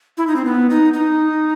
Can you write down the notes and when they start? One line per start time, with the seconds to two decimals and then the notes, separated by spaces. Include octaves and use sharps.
0.18 E4
0.27 D#4
0.36 C4
0.45 B3
0.70 D#4
0.93 D#4